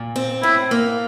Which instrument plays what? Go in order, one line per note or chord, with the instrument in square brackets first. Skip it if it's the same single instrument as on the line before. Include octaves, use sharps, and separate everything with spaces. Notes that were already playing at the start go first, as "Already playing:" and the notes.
Already playing: [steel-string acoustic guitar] A#2
C4
[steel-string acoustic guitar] A2 [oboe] E4
[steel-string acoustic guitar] A#3